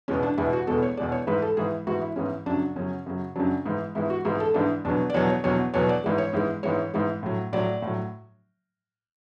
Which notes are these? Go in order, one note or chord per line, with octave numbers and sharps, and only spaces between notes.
E2 B2 G#3 C#4
D4
E2 B2 G#3 E4
F#4
E2 B2 G#3 A4
C#5
E2 B2 G#3 D5
C#5
G#2 E3 G#3 B4
A4
G#2 E3 G#3 G#4
G#2 E3 G#3 F#4
E4
G#2 E3 G#3 C#4
F#2 C#3 F#3 D4
F#2 C#3 F#3 C#4
F#2 C#3 F#3
F#2 C#3 F#3 D4
G#2 E3 G#3
G#2 E3 G#3 E4
F#4
G#2 E3 G#3 G#4
G#4
A4
G#2 E3 G#3 D4
E2 B2 F#3 D4
D5
E2 B2 F#3 C#5
C#5
E2 B2 F#3 C#5
E2 B2 F#3 C#5
D5
G#2 E3 G#3
C#5
G#2 E3 G#3
G#2 E3 G#3 C#5
G#2 E3 G#3
A2 F#3
A2 F#3 D5
A2
F#3